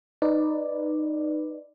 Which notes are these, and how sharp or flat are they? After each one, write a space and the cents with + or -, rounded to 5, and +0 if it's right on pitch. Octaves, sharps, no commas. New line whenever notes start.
D#4 -15 B4 +0 D5 +0